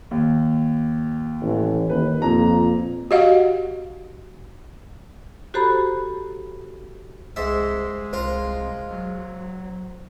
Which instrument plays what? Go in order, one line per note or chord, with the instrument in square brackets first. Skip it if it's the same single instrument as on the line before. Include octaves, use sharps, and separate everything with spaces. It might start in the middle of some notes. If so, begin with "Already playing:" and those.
[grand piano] D#2
[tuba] A1
[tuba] D#2 [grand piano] B4
[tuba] F2 [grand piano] A#2 A#5
[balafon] F#4 G4 D#5 F5 F#5
[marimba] F#4 G4 A4 C5 A#5 B5
[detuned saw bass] C2 [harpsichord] G#2 C5 E5 [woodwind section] G#3
[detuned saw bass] C2 [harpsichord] F4 A#4 [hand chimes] C5
[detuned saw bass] F#3